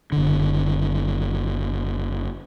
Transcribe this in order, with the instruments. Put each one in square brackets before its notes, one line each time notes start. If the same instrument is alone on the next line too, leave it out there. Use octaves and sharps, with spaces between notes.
[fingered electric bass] F#1 D3